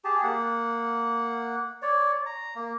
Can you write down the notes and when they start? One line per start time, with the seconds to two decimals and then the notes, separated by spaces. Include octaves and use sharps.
0.05 G4 G#4 A5
0.23 A#3 F#5
1.82 C#5 D5
2.26 A#5
2.55 A#3